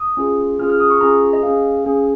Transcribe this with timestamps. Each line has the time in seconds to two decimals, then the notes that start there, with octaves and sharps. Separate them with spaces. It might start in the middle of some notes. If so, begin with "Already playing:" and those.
Already playing: D#6
0.17 C#4 F4 G#4
0.59 C#4 F4 G#4 F6
0.70 F6
0.80 D#6
0.90 C#6
1.01 C#4 F4 G#4 A#5
1.33 D#5
1.43 C#4 G#4 F5
1.85 C#4 G#4